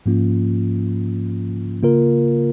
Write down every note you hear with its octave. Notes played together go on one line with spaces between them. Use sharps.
G#2 F3 A#3 C#4 F4
C#3 A#3 F4 A#4